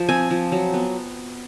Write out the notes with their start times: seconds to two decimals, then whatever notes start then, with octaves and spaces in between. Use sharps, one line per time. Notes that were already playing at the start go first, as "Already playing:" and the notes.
Already playing: F3
0.09 C4 G#5
0.31 F3
0.52 F#3
0.74 B3